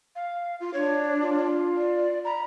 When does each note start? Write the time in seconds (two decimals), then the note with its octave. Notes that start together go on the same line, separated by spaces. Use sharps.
0.16 F5
0.60 F4
0.74 D4 C#5
1.22 F4
1.76 D5
2.25 A#5 B5